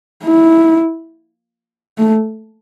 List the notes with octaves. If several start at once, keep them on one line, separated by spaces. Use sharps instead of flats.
E4
A3